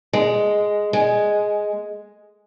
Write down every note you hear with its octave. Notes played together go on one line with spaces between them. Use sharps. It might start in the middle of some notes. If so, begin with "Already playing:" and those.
G#3
G#3